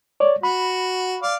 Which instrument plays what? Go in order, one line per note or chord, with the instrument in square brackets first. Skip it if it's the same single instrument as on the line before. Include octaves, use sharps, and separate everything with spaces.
[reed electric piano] C#5 D5
[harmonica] F#4 [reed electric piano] B5
[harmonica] D5 F5